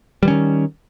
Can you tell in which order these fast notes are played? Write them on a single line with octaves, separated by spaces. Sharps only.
G3 E3 C#4 D#3